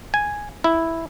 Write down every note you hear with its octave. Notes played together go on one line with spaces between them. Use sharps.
G#5
E4